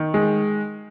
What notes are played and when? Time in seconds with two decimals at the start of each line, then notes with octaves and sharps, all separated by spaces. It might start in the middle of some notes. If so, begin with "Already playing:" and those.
Already playing: D#3
0.14 G#3